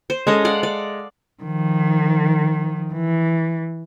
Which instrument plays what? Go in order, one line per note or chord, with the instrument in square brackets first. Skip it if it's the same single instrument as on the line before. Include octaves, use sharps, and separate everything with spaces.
[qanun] C5
[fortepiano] G#3 [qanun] C#4 A4 D#5
[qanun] D5 F5 F#5
D5
[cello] D#3 F3
E3